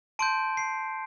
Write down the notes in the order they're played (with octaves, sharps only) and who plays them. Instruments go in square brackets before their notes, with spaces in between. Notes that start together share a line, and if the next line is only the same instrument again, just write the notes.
[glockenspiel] A5 C6 G6 D7
C7